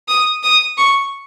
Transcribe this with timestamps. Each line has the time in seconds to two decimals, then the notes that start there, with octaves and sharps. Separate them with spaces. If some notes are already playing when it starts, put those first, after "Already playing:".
0.08 D#6
0.43 D#6
0.78 C#6